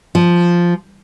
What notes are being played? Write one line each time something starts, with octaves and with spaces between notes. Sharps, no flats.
F3